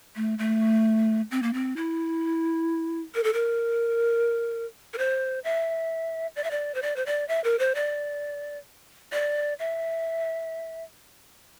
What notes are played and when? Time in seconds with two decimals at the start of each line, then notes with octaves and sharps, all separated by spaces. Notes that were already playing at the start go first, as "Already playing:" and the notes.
0.16 A3
0.39 A3
1.31 C4
1.42 A#3
1.53 C4
1.76 E4
3.15 A#4
3.24 A4
3.33 A#4
4.94 A#4
4.98 C5
5.44 E5
6.36 D5
6.44 E5
6.51 D5
6.75 C5
6.82 D5
6.96 C5
7.06 D5
7.28 E5
7.44 A#4
7.59 C5
7.75 D5
9.12 D5
9.59 E5